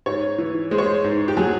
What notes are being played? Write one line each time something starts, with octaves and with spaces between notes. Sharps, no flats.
G#2 C#5
E3
G#3 C5
C#5
C5
G#2
G4
F#3 G#4